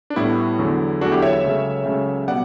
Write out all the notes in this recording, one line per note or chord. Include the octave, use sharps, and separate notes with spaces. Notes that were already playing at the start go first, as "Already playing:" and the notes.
D4
A2 G3 B3 E4
E2 D3 F#3 A3
E2 D3 F#3 A3 D4 F#4
E4 G4
C#5 E5
C#5 E5
C#2 C#3 F#3 A3
C#2 C#3 F#3 A3
B2 G3 B3 D5 F#5